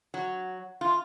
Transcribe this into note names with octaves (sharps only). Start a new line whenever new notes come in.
F#3
F4